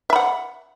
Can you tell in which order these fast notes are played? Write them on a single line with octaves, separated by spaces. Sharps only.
E5 B5 F#5